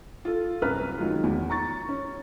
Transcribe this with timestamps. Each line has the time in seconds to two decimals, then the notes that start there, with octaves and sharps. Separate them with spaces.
0.25 F4 A4
0.62 C2 F#2 B4 A#5 F6
0.98 D#3 F#3 G#3 F4
1.24 E2
1.50 A#5 C#6 A6
1.89 C#4